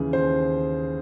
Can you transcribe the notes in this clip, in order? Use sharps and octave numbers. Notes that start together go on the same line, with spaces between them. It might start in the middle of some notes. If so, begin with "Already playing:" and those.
Already playing: D#2 C#3 E3 G#4
D#2 C5